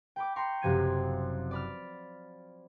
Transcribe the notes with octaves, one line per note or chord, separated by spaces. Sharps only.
G5 B5 D6
G5 A#5 C6 C#6
F#1 F#2 C3 F3 G#6 D#7
D5 B5 F6